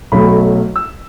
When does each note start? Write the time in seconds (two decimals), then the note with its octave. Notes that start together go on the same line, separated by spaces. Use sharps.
0.12 B1 B2 F#3 A3 B5
0.76 E6